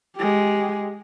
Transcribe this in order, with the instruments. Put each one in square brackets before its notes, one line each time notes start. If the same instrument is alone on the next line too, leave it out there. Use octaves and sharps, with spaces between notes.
[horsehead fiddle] G#3 G4